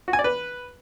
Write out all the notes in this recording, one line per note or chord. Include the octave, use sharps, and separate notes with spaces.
F#4
G#5
D5
B4